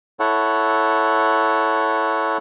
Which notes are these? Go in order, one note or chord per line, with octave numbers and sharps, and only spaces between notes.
E4 A4 C#5 F#5